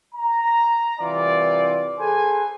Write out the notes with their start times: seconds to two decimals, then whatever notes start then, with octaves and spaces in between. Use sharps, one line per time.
0.15 A#5
1.00 C2 E3 C4 F4 D5
2.00 G#4 A4 B4 C5 G#5